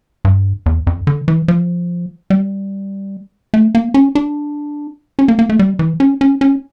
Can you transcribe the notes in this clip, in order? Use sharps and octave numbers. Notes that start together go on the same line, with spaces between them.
G2
E2
F2
D3
E3
F3
G3
A3
A#3
C#4
D4
C#4
A#3
A#3
A3
G3
E3
C#4
C#4
C#4